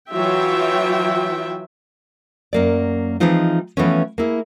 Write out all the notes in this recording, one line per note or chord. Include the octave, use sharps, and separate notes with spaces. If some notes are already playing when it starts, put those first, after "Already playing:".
E3 F#3 F4 E5 G5
F#2 A#3 D5
E3 F3 G#3 C4 D#4 F4
E3 F3 A3 B3 C#4
A#3 E4 G#4